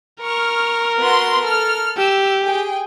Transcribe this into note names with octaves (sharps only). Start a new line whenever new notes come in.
A#4 C#6 F6
B3 F#4 C6
A4 F6
G4 E6
G#4 G5